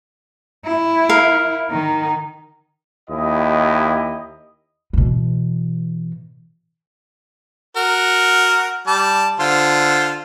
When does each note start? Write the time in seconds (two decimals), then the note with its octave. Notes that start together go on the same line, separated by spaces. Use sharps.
0.65 E4
1.09 A#4 F5
1.70 D#3 D#4
3.10 D#2 E4 G4 D#5
4.93 B2 E3
7.77 F#4 A#4
8.87 G3 A5 D6
9.40 D3 F4 C5